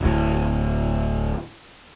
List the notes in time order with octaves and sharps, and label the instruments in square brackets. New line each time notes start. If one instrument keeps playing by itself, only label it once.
[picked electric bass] D1 A2